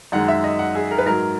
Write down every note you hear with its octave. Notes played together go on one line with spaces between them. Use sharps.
F#2 D#3 G#3 F#5
E5
D#5
F#5
G#4
A#4
B4
G#2 F#3 A#4